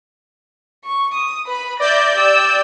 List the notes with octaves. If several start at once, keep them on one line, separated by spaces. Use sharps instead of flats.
C#6
D#6
B4 B5
D5 E5 G6 A#6
G4 E6